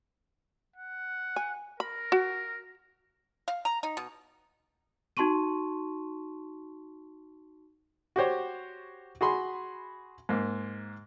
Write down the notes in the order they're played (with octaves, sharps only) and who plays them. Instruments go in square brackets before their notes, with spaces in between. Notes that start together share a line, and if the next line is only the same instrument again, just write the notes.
[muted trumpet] F#5
[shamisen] G#5
[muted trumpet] A#4 [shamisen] B5
[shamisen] F#4
[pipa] F5
A#5
D#4
B2
[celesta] D#4 F#4 A5 C6 C#6 D#7
[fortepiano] F#4 G4 C5 C#5
F#4 G#4 B5 C6
G#2 A#3